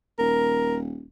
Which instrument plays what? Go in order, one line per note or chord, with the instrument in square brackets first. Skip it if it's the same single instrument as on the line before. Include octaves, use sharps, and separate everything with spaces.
[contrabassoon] D#1 [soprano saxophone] A#4